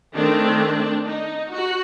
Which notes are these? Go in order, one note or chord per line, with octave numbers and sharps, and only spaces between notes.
D#3 A3 C4 D4
D#4
F#4